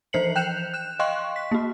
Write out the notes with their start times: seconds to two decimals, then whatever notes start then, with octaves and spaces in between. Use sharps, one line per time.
0.13 E3 F3 C5 C7 C#7 F#7
0.36 G5 F#6 G6 E7 F7
0.74 F#6 E7
0.99 D#5 F5 G5 C6 C#6 F#6
1.36 B6
1.51 A#3 F#4